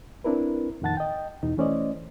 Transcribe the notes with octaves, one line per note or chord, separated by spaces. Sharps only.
C4 D4 E4 A#4 B4
F2 A#2 D#3 F#5 A5 A6
D#5 G5
E2 B2 D#4
E3 A3 C#4 C5 D5 D#5